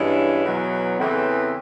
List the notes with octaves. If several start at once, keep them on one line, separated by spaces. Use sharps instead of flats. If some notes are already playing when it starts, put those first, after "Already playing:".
Already playing: G2 E3 G#3 C#4 E4
E2 B2 F#3
E2 C#3 E3 A3 C4